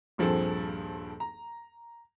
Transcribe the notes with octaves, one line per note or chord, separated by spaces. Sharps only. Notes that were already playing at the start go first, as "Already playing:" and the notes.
D#1 G2 F3 C4 G#4 A4
A#5